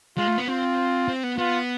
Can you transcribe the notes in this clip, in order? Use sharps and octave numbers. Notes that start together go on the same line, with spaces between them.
G#3 F4
A3
B3
C4 F4
C4
B3
B3 F4